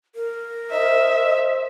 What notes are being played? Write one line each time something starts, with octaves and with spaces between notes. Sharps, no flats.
A#4
C5 D#5 E5